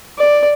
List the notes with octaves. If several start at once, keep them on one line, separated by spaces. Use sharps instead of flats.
D5